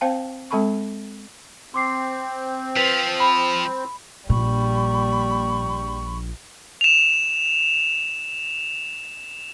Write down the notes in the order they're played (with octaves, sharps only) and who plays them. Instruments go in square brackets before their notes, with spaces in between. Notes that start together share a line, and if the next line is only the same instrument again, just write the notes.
[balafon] C4 C5 F5 G5 A5
G#3 C4 A4 A5 B5 C#6
[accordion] C4 [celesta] C6 D6 C7
[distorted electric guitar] F3 [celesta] B4 B6
[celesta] B5
[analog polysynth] A#1 [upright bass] A#2 [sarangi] G3 [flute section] B5 C#6
[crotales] E7 F7